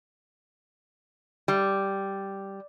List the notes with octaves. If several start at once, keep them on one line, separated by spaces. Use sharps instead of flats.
G3